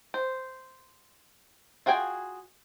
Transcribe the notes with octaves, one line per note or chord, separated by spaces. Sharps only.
C5
F4 F#4 G#4 G5 G#5